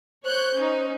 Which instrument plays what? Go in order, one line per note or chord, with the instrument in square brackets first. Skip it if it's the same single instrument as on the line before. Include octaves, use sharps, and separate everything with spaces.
[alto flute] C5 [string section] C#5 F#6 G6
[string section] C#4 D#4